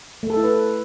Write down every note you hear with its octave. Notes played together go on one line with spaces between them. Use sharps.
A3
A4
E4
B4